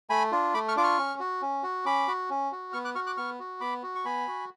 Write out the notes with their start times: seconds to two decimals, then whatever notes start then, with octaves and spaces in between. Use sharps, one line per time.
0.10 A3 G#5 B5
0.32 D4 F4
0.54 A3 B5 D6
0.68 C#6 F6
0.76 D4 F4 D6
0.83 C#6 F6
0.98 C#4
1.20 F#4
1.42 C#4
1.63 F#4
1.85 C#4 B5 D6
2.08 F#4
2.30 C#4
2.52 F#4
2.73 B3 C#6 F6
2.85 D6 F#6
2.95 F#4 C#6 F6
3.06 D6 F#6
3.17 B3 C#6 F6
3.40 F#4
3.61 B3 B5 D6
3.83 F#4
3.95 C#6
4.05 B3 G#5 B5
4.28 F#4